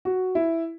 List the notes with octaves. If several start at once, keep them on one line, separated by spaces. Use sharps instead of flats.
F#4
E4